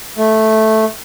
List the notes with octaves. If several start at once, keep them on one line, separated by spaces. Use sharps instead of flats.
A3